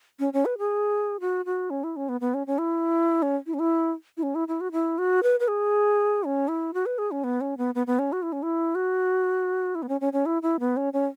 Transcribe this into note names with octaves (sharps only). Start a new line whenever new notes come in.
C#4
C#4
B4
G#4
F#4
F#4
C#4
E4
C#4
B3
B3
C#4
C#4
E4
C#4
E4
C#4
E4
E4
C#4
E4
E4
F#4
E4
F#4
B4
B4
G#4
C#4
E4
F#4
B4
G#4
C#4
B3
C#4
B3
B3
B3
C#4
F#4
E4
C#4
E4
F#4
E4
B3
C#4
C#4
C#4
E4
E4
B3
C#4
C#4